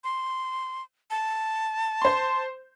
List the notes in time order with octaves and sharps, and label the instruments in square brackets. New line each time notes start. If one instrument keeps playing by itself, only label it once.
[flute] C6
A5
[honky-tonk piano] C5 C6